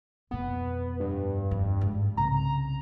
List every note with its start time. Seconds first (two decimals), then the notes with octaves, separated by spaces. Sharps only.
0.31 F2 B2 B3
1.00 G2
1.51 F2
1.81 G#2
2.17 C2 C#3 A#5